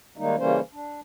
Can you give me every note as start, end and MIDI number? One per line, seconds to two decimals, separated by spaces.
0.17 0.36 51
0.17 0.36 55
0.17 0.36 56
0.17 0.36 58
0.17 0.36 63
0.38 0.60 49
0.38 0.60 52
0.38 0.60 55
0.38 0.60 58
0.38 0.60 61
0.38 0.60 72
0.73 1.01 62